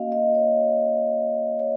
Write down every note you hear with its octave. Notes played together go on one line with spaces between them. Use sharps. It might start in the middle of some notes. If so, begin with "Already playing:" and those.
Already playing: A#3 C#4 F#4 D#5 F5
D#5
C#5
C#5